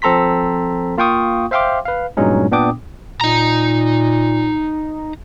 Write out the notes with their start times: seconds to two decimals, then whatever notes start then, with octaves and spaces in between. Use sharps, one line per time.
0.02 F3 C4 A4 A#5 C6 B6
0.98 A#3 F4 F5 G5 C#6 D#6
1.51 C5 E5 F5 G5 C6 D6
1.85 B4 F5
2.17 G2 A#2 F#3 G#3 C#4 D#4
2.51 A#2 B3 D4 G5 D6 D#6
3.21 A#2 D#4 A#5